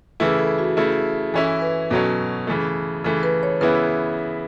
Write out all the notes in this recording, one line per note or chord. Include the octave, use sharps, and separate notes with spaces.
C#3 E3 A3 E4 B4
A4
F#4
C#3 A3 E4
E3 C#4 E4 A4
B4
B2 F#3 C#4 A4
C#3 E3 A3
C#3 E3 A3 A4
B4
C#5
C#3 E3 B3 E4 B4